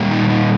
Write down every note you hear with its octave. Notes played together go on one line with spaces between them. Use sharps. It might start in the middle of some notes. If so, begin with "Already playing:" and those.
Already playing: A#2 G3 A#3
D#4
D#4